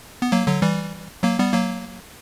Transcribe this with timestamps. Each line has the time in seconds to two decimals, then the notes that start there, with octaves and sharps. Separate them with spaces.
0.22 B3
0.32 F#3 A#3
0.47 D3 F#3
0.62 E3 G3
1.23 F#3 A#3
1.39 G3 B3
1.53 F#3 A#3